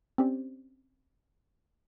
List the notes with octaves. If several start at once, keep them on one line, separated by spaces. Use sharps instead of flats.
C4 C#4 G4 C5 D5